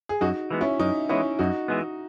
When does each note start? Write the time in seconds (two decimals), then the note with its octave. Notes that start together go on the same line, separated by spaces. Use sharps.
0.09 G#4
0.21 F#2 D#4 F#4
0.51 E3 G#3 B3
0.61 C#4 E4
0.80 F#2 D#4
1.09 E3 G#3 B3 C#4 E4
1.39 F#2 D#4 F#4
1.68 E3 G#3 B3